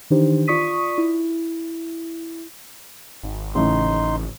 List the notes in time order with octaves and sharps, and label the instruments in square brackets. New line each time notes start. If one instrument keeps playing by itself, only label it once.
[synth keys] D#3 E3 D4 D#4 G4 C5
F4 D5 C#6 D#6 B6 D#7
E4
[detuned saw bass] G#1
[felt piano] A2 C#3 E3 [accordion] D#4 C6